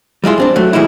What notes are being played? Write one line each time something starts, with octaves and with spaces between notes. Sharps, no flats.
G3 G#3 E4 F4
G2 C4 D4
F#3 A3
E3 G3 G#3 D#4 E4